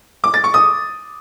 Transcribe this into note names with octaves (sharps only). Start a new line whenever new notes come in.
D6
A6
C#6
D#6